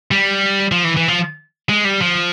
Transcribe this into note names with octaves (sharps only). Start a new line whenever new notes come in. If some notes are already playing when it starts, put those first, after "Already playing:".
G3
F3
E3
E3
F3
G#3
G3
F3